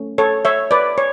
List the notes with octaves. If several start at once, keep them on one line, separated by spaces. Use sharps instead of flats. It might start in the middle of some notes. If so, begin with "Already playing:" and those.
Already playing: A3 C#4
A4 C#5
C#5 E5
B4 D5
C#5